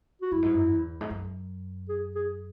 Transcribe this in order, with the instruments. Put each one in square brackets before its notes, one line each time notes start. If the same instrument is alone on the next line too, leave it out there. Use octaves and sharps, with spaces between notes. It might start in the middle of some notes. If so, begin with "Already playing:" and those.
[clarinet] F#4
[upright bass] F#2 [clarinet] E4
[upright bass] G#2
F#2
E2
G#2
F#2
[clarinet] G#4
G#4